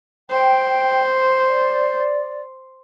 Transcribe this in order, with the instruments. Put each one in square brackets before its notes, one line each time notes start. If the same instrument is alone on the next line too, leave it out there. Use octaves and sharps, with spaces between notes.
[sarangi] C5 [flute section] G5
[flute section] D5